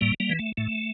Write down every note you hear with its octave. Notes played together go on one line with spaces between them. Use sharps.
A2 G3 A#3
G3 A#3
E3
A3
A2 A3